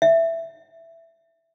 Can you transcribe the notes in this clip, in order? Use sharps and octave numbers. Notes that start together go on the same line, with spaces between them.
E5